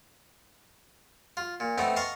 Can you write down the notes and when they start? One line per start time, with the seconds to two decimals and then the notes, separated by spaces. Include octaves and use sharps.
1.37 F4
1.60 A#2
1.78 A3 B3 C4 D#4
1.96 D#5 F5 A5 C6 C#6